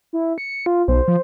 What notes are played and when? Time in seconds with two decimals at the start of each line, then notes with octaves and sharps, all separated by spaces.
0.13 E4
0.38 C#7
0.66 F4
0.88 B1 C5
1.08 F3